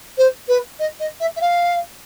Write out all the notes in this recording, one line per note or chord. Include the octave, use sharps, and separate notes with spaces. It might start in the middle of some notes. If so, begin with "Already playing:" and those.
C5
B4
D#5
D#5
E5
E5
F5